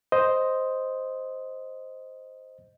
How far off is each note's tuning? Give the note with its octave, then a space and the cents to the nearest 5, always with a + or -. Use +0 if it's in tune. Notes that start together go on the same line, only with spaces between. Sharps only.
C5 +0 D#5 +5